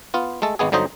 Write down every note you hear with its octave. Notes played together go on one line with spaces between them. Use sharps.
B3 F4
G#3 A3 A4
G#1 G#3 B3 G#4
G1 D3 F#3 D#4 C5 D#5